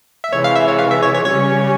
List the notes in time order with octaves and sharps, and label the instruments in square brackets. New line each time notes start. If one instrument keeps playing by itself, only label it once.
[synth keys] E5
[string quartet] C3 E3 G#3 [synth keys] C#5
[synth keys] F5
E5
C#5
F5
E5
C#5
C#5
[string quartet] C#3 G3 C#4 [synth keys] C#5